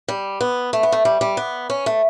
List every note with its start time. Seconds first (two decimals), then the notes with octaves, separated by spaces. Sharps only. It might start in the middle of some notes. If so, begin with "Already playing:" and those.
0.08 G3
0.41 B3
0.73 A3
0.83 B3
0.92 A3
1.05 G3
1.21 G3
1.37 B3
1.70 C#4
1.86 A3